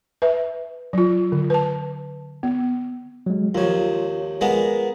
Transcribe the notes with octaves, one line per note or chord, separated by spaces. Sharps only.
B4 E5
F#3 F4
D3
B4 A5
B3
F#3 G#3
D#2 F3 F4 C#5
G#3 A#3 B3